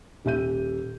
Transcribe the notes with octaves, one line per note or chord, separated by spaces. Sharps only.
D#1 G4 E5 G6 D#7